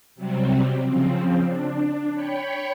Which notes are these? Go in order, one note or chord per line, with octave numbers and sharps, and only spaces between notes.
C3 F#3 G3 C4
C#3 F3 C4
D4
C#5 G5 B5 C#6